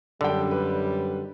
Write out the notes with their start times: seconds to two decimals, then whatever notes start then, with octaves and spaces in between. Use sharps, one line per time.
0.21 F#2 D3 G3 D4 G5
0.51 B4